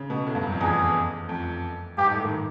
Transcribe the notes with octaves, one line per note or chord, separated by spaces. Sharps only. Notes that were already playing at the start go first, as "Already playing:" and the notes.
Already playing: C#3
B2
A2
G2
F#2
F2
E2 G#4
F2
G2 G4
G#2
A2
D#3